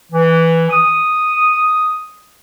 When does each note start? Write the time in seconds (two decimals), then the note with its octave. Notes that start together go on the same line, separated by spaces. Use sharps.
0.12 E3
0.70 D#6